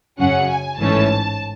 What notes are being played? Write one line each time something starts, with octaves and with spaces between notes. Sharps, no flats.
F#2 C#3 F#3 C#4 F#5
G#5
A1 G#2 E3 A3 C#4 A5